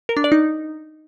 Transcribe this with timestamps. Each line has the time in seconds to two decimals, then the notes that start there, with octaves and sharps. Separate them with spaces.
0.09 A#4
0.17 D4
0.24 D5
0.32 D#4